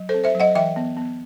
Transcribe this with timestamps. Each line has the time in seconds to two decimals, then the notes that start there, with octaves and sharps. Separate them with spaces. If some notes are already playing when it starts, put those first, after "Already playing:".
Already playing: F#3
0.09 A4 C5
0.14 C4
0.24 C5 E5
0.35 F#3
0.40 D#5 F#5
0.55 E3 E5 G5
0.76 B3
0.97 B3